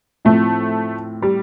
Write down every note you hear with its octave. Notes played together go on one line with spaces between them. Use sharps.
A2 F3 A3 C4
G3